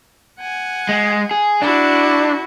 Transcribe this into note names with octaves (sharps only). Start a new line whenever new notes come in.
F#5 G#5
G#3
G#4
D4 E4 F#4